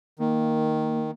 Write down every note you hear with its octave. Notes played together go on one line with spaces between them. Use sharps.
D#3 A#3